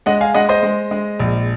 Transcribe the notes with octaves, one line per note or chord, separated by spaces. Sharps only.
G#3 D#5 F#5
F5 G#5
G#3 D#5 F#5
C5 D#5
G#3
G#3
A#1